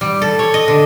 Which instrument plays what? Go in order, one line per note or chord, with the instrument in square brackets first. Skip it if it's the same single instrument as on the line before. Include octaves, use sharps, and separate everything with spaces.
[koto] G3
A4
C#5
D#5
D3